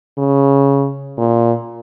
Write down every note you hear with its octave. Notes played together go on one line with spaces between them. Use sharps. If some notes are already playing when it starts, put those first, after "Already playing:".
C#3
A#2